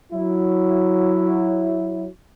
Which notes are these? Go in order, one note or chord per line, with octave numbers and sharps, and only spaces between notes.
F#3 E4